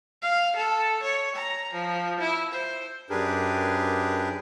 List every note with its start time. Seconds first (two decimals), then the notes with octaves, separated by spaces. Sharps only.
0.22 F5
0.56 A4
1.03 C#5
1.36 A#5
1.73 F3
2.20 E4
2.52 C5
3.10 F#2 D4 G4 G#4 A#4 B4